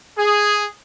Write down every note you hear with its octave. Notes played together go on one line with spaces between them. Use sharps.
G#4